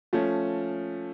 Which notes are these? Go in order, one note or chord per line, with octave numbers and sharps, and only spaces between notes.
F3 A3 C#4